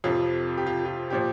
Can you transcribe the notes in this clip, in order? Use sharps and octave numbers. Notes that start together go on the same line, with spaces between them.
F2 C3 F3 F4
G4
F4
F4
A#2 F3 G4